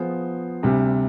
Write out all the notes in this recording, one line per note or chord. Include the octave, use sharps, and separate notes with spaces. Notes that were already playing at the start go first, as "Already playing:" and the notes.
Already playing: F3 B3 F4 G#4 C5
D2 C3 G3